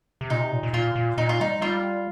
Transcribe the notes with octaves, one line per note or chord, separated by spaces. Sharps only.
C3
A#2 D#4
C3
A#2
A#2
A#2 F4
A#2
A#2 D#4
F4
G3 D#4
G3 F4